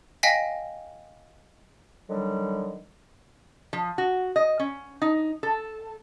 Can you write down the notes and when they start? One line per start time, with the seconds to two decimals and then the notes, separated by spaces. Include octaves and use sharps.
0.23 D#5 F5 G5 G#5 A#6 B6
2.09 D3 D#3 F#3 G3
3.73 F3
3.98 F#4
4.36 D#5
4.59 C#4
5.02 D#4
5.43 A4